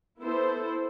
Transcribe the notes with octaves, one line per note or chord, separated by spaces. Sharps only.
B3 E4 A4 C5